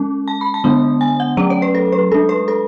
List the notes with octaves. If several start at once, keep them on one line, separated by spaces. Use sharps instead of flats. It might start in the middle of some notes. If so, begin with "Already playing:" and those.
Already playing: G#3 C#4
A5
B5
A5
D3 G#3 B3 D4
G#5
F#5
F#3 A3 C#4 D5
C#5
B4
A4
B4
G#3 D4 A4
B4
A4